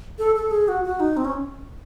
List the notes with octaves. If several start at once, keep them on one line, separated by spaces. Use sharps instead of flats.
A4
A4
G#4
F#4
F#4
D#4
C4
C#4